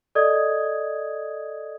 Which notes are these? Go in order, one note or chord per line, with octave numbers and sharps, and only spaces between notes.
A4 D5 D#5 D#6 G#6